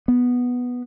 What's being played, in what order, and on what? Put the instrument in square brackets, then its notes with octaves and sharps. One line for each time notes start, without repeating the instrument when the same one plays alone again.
[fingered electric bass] B3